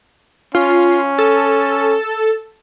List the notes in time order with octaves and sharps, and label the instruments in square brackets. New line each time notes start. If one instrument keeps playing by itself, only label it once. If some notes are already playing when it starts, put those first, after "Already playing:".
[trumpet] C#4 [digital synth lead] F4
[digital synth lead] A4